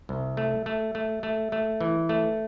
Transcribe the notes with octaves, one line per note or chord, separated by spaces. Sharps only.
C2
A3
A3
A3
A3
A3
E3
A3